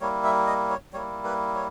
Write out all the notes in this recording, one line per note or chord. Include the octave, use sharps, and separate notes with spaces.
G3 A#3 E4 C#5
E5
D#5
C#5
G3 A#3 E4 C#5
B4
C#5